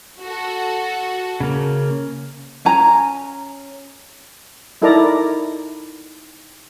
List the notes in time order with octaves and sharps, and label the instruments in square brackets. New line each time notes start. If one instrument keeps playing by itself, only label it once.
[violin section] F#4 A4
[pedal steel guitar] C#3 A#3
[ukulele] C#4 G#5 A#5
[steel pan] D#4 E4 A4 A#4 D5 A#5